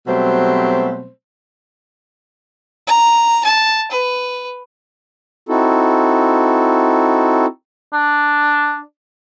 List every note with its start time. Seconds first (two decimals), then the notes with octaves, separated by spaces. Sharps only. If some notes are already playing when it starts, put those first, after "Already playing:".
0.07 B2 F#3 G3 A3 C4 C5
2.87 A#5
3.44 A5
3.91 B4
5.49 C4 D#4 E4 F#4 A4
7.93 D4